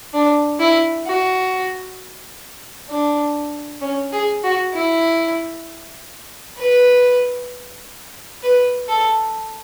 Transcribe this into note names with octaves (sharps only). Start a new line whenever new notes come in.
D4
E4
F#4
D4
C#4
G#4
F#4
E4
B4
B4
A4